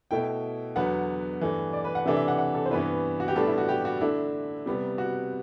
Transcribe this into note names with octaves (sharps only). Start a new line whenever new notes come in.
B2 A3 E4 G5
E2 D3 F#3 B3 F#5
G2 E3 A3
D5
B4
F#5
C3 E3 A3 D4 E5
E5
F#5
F#5
A4
C5
G2 E3 B3 E4 B4
F#4
G4
A2 G3 B3 D4 A4
E4
F#4
G4
F#4
D3 A3 D4 E4
C3 G3 B3
F#4